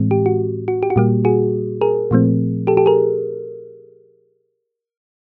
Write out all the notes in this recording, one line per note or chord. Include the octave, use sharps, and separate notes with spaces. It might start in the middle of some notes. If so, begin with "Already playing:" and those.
Already playing: A2 E3 G#3 C4
G4
F#4
F#4
G4
F#4
A#2 G3 A#3 G4
F#4 G#4
G#4 A#4
A#2 F3 A3 C4
G4 A4
G4 A4
G#4 A#4